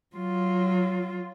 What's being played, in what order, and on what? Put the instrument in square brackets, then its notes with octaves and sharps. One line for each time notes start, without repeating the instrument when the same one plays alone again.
[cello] F#3 F4